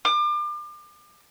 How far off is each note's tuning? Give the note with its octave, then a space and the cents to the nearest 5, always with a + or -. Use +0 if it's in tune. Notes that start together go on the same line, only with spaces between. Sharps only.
D6 +35